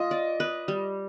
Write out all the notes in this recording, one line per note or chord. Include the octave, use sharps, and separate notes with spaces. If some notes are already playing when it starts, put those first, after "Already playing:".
Already playing: F4 D#5
D5
B4
G3